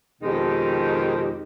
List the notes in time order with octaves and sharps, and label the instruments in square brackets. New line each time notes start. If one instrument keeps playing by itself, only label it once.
[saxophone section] F2 B2 D#3 G#3 D#4 G4